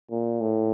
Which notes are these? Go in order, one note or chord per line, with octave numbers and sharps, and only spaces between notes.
A#2
A2